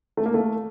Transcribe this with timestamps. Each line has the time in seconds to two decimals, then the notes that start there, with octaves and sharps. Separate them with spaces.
0.17 A3
0.26 A#3
0.34 A3